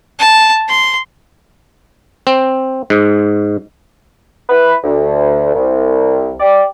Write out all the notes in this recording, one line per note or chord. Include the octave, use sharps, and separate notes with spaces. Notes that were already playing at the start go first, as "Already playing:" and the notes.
A5
C6
C4
G#2
E4 B4
D2
C2
G4 D5